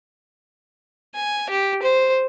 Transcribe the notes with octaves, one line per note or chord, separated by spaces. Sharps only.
G#5
G4
C5